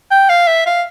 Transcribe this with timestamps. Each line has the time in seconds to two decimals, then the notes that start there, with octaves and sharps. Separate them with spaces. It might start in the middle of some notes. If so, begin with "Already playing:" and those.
0.11 G5
0.29 F5
0.47 E5
0.66 F5